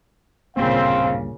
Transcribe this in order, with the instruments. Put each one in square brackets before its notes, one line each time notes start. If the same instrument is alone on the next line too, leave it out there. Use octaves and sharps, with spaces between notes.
[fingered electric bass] D1 G2 A#3 [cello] A#2 C#3 [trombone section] C4 [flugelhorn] F5